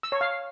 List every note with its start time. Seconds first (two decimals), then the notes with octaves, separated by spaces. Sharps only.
0.03 E6
0.12 C#5
0.21 F5